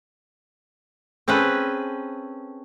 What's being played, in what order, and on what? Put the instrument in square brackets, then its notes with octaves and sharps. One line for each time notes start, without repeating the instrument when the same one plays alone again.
[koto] C4 C#4 G#4 A4 B4